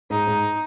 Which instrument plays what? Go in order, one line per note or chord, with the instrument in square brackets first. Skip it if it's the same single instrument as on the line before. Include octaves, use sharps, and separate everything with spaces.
[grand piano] G#2 [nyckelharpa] D#4
[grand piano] G#2